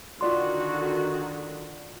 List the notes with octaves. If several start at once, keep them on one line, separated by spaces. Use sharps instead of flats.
D3 D#3 F4 F#4 D5 C6